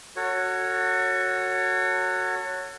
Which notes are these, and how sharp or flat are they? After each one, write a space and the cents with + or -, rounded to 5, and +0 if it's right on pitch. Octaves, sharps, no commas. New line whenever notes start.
F#4 +0 A4 +40 C#5 +0